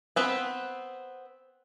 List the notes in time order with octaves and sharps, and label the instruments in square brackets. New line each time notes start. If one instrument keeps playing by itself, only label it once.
[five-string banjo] B3 C4 B4